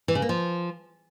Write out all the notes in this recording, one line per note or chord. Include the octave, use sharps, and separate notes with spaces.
E3
C#3
A#3
F3